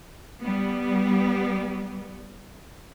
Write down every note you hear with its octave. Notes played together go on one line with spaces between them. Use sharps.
G3 B3